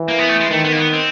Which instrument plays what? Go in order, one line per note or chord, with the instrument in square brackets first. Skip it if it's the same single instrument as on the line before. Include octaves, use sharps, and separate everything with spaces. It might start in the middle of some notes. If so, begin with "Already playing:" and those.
Already playing: [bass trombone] E3
[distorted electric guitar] A#3
B3
A3
G#3
[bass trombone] D#3 [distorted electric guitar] A3
[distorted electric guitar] B3
A#3
B3
C4